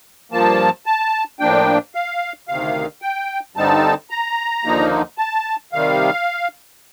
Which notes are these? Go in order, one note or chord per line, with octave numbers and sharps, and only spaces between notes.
G2 F3 A#3 A5
A5
A2 F3 A#3 D4 G5
F5
D2 C3 D#3 F5
G5
G2 D3 G3 C4 D#4 A5
A#5
D#2 D3 F3 A#3 D#4
A5
C3 D#3 G3 F5